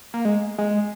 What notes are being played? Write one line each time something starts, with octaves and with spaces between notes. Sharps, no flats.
A#3
G#3
G#3